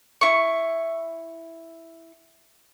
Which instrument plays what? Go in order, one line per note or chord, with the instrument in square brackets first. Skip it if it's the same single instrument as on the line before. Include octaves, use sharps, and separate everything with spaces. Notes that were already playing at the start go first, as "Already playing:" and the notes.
[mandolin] E4 C#6